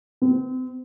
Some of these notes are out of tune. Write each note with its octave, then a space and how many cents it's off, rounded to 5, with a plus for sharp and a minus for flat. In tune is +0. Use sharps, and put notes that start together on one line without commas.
C4 -35